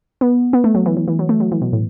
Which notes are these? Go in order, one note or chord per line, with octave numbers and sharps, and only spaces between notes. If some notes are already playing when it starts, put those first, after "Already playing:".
B3
B3
A3
F#3
E3
E3
E3
F#3
A3
F#3
E3
B2
A2